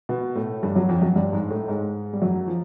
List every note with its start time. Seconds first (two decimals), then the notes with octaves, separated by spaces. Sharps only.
0.09 B2 B3
0.35 A2 A3
0.63 G2 G3
0.76 F#2 F#3
0.89 F2 F3
1.02 F#2 F#3
1.16 G2 G3
1.33 G#2 G#3
1.50 A2 A3
1.68 G#2 G#3
2.13 G3
2.22 F#2 F#3
2.48 F3